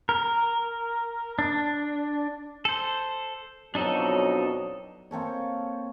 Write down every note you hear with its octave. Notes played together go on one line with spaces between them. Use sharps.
A#4
D4
A4 C5
F2 B2 F#3 D4 D#4 A4
A#3 C4 A4 C#5